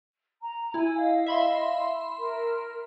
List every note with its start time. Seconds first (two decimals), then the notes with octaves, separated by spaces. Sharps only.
0.42 A#5
0.74 E4 G#5
0.97 D#5 F5
1.26 E5 B5 C6
2.19 A#4